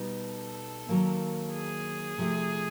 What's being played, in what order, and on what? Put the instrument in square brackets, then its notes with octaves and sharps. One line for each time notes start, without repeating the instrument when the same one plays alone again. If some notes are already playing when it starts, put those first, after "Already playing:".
Already playing: [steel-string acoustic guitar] B2 G3 B3 D#4
[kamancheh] A4
[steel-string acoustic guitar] D#3 F#3 A#3
[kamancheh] G#4
[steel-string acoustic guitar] C3 F3 A3